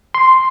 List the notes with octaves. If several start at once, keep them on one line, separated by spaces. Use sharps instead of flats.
C6